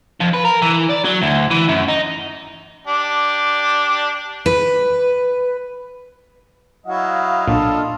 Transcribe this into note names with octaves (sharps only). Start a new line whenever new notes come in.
F2
B4
A#4
E3
D5
F#3
D2
E3
F#2
D#4
D4 G4
B4
F#3 E4 D#5 F5 F#5
B1 A#2 D4 F4 A4